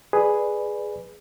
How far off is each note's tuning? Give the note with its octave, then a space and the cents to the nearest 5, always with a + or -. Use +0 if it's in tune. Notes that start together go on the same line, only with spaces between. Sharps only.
G#4 +0 B4 +0 D5 +20